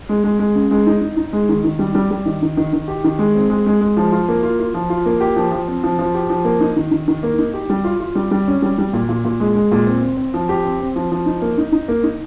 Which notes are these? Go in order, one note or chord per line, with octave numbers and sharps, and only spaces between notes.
G#3
G#3
G#3
C#3
G#3
D#4
D#4
D#4
G#3
D#3
D#3
G3
G3
G3
D#3
D#3
D#3
D#3
G4
D#3
G#3
C4
G#3
G#3
G#3
F3
F4
A#3
F4
F4
F3
F4
A#3
G4
F3
F3
C4
F3
F3
G4
F3
A#3
D#4
D#3
D#3
D#3
A#3
D#4
G4
G3
F4
F4
G3
G3
C#4
G3
G3
A#2
A#2
A#2
G#3
G#3
A#2
C4
C4
C4
F3
G4
C4
C4
F3
F3
D#4
A#3
D#4
D#4
A#3
D#4